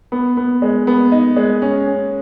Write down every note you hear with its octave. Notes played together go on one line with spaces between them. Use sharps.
B3
B3
G#3
B3
D#4
G#3
C#4
C#4